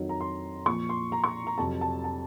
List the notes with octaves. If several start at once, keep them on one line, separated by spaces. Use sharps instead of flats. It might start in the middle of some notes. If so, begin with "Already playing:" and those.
Already playing: F2 D#3 F#3
A#5
C6
A#2 F3 C#6
C6
A#5
C#6
A#5
F2 C3 F#3 A5
A5
A5